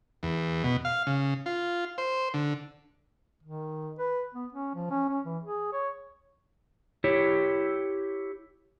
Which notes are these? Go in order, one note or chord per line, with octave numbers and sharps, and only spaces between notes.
E2
B2
F5
C#3
F4
C5
D3
D#3
B4
B3
C#4
F3
C#4
C#4
E3
G#4
C#5
E4 G4 C#5